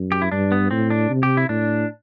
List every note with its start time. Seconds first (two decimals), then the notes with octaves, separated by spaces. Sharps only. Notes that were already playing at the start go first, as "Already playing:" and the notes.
Already playing: F#2
0.12 G4
0.22 E4
0.32 G2 D4
0.52 B3
0.71 A2 C4
0.90 D4
1.10 C3
1.23 G4
1.37 E4
1.49 A2 D4